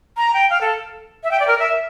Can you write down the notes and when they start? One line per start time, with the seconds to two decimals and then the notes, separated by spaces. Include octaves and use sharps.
0.17 A#5
0.34 G5
0.50 F5
0.61 A4
1.23 E5
1.31 G5
1.40 D5
1.47 A#4
1.59 E5